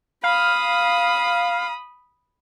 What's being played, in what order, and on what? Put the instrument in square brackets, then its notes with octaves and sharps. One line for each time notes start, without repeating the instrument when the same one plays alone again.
[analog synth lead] F5 [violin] B5 D#6